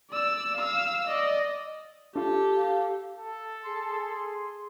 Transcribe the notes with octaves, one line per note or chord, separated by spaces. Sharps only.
D5 E6
F5 E6
D5 D#5
D4 F4 G4 A4
F5
A4
G#4 C6